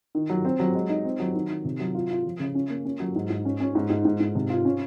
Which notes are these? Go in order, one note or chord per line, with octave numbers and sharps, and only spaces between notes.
D#3
F#3
C4
F#3
G#3
D#4
C4
F#3
D#3
D#3
C3
F#3
F4
F4
F3
C#3
C#4
A#3
C#4
F#3
G#2
G#2
C#4
C#4
G#2
G#2
G#2
G#2
C3
F4
C#4